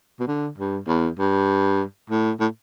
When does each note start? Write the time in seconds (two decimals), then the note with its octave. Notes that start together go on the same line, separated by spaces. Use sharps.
0.19 B2
0.27 D3
0.58 G2
0.87 E2
1.19 G2
2.10 A2
2.40 A2